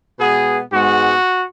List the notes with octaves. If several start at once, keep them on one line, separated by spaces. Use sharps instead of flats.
B2 G#3 B3 G#4
G#2 G#3 B3 F#4